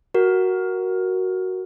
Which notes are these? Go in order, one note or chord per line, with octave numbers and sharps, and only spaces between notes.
F#4 A#4